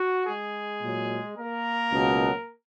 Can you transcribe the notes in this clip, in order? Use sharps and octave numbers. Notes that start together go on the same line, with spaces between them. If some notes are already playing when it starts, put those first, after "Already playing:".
Already playing: F#4
G#3 G#4
A#2 F#3
A#3 A#4
C#2 B2 F#3